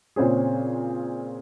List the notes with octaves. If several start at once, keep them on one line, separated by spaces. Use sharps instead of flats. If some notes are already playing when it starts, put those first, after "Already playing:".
A#2 C#3 C4 C#4 G#4